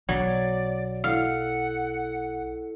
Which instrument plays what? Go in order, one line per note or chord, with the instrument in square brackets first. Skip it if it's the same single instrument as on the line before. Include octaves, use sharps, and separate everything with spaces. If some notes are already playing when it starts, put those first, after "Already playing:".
[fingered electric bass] B1 [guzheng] F#3 [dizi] D5
[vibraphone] E4 A4 D5 [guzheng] F5 [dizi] F#5